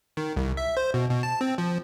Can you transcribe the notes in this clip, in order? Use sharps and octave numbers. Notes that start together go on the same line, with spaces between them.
D#3
C2
E5
C5
B2
B2
A5
C4
F3